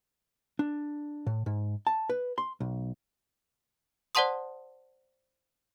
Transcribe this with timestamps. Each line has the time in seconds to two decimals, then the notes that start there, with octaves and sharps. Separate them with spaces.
0.59 D4
1.27 A2
1.46 G#2
1.87 A5
2.10 B4
2.38 C6
2.60 B1
4.15 C5 D5 F#5 A5 C6 D#6